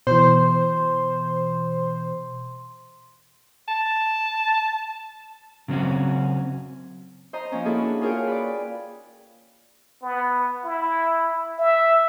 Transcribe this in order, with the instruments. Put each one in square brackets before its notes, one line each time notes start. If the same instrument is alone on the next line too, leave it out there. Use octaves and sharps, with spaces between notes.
[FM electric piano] B2 E3 [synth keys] C5 [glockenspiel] C6
[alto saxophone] A5
[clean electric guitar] C#3 F#3 C4 C#4 F#4
[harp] C5 D#5 A#5
F3 A#3 C#4
A#3 D#4 E4 F#4 G#4 A4
D4
F4 G#4 A#4 C#5 F5 G5
B4 D5
[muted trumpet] B3
E4
E5